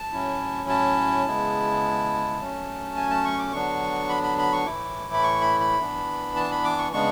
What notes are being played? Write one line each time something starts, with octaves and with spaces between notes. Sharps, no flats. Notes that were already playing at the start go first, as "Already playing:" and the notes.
Already playing: A5
A2 F#3 C#4 E4
A5
C#3 G#3 B3 E4
F#3 A3 C#4
G#5
A5
C#6
D6
D3 F#3 B3 D4 C#6
B5
B5
B5
C#6
A2 E3 A3 E4 D6
B5
C#6
B5
B5
E3 B3 D4
A5
B5
D6
C#6
C#3 G#3 B3 D4 C#6